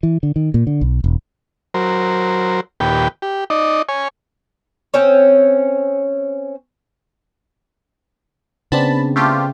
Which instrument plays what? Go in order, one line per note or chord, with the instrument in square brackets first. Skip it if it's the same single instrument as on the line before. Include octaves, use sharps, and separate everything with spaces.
[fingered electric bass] E3
D3
D#3
A#2
D3
B1
E1
[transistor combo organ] F#3 A#4 C5
D#2 A#2 G4 B4 G5
G4
D#4 D5 D#5
C#5 G#5
[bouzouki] C4 C#4 C#5
[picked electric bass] C#3 [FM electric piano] B3 C4 D4 [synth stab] A5 B5
[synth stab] A3 F4 G4